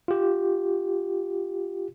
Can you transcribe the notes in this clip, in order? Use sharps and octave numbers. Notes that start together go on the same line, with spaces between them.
F4 G4